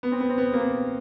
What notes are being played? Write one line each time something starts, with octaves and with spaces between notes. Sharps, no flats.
B3
C4
B3
C4
B3
A#3
B3